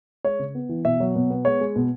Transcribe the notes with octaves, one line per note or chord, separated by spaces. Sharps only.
G#3 C#5
C#3
B3
E3
B2 E5
F#3
B2
B3
G#3 C#5
G#3
B2